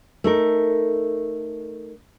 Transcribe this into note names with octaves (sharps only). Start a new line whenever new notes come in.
A3 D#4 A#4